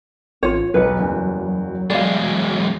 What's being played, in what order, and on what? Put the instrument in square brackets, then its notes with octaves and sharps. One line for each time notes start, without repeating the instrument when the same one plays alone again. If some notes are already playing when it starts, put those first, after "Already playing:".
[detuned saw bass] A1 [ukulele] F4 C#5
[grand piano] E1 B1 C#7 [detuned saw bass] F#3 [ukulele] B4
[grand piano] F#1 E2 G3
[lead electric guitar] E2 G#3 [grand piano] G3 [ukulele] D5 F5